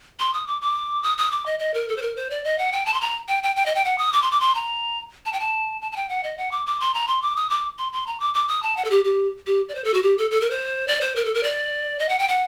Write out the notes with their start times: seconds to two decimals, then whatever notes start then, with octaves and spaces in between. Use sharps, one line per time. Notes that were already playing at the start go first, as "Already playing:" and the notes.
0.19 C6
0.34 D#6
0.47 D6
0.61 D6
1.03 D#6
1.18 D#6
1.32 D6
1.46 D#5
1.59 D#5
1.74 A#4
1.89 A4
1.97 C5
2.02 A#4
2.16 C5
2.30 D5
2.44 D#5
2.59 F#5
2.72 G5
2.86 A5
2.94 C6
3.01 A#5
3.28 G5
3.43 G5
3.56 G5
3.66 D#5
3.75 G5
3.85 F#5
3.98 D#6
4.13 D6
4.22 C6
4.31 D6
4.40 C6
4.55 A#5
5.26 A5
5.33 G5
5.40 A5
5.82 A5
5.92 A5
5.96 G5
6.09 F#5
6.24 D#5
6.38 F#5
6.51 D6
6.66 D6
6.80 C6
6.94 A#5
7.08 C6
7.22 D6
7.36 D#6
7.50 D6
7.78 C6
7.93 C6
8.07 A#5
8.20 D6
8.34 D6
8.48 D#6
8.63 A5
8.77 F#5
8.85 A4
8.90 G4
9.04 G4
9.46 G4
9.69 D5
9.75 C5
9.84 A4
9.94 F#4
10.03 G4
10.18 A4
10.31 A4
10.41 A#4
10.50 C5
10.88 D5
11.01 C5
11.16 A#4
11.25 A4
11.34 A#4
11.43 D5
11.99 D#5
12.09 F#5
12.19 G5
12.28 F#5